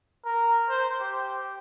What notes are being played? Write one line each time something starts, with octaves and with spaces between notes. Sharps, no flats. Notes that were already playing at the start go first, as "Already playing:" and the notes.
A#4
C5
G4